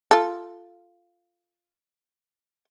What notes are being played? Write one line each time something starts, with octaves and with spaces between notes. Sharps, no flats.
F4 A4